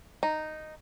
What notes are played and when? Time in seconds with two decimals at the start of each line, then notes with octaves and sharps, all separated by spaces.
0.23 D#4